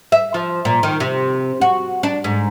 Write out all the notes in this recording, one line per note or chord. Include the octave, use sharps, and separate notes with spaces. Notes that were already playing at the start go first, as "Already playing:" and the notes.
E5
F3
A#2
D#3
C3
F#4
D4
G#2